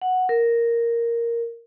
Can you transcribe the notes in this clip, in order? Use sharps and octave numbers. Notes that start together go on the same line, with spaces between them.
F#5
A#4